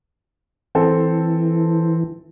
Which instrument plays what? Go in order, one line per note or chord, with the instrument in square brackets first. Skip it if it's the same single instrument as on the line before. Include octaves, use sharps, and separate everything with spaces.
[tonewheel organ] E3 [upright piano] C4 A4